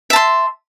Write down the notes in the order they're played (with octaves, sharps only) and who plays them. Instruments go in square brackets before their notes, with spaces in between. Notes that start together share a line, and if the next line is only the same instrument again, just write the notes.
[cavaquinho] E5
A5
C6